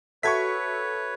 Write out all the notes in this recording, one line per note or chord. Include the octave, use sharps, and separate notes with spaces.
F#4 A4 B4 C#5 E5 C#6 G#6 B6